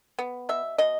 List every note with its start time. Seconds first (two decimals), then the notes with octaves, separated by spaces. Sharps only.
0.19 B3
0.49 B2 E5
0.78 B2 D#5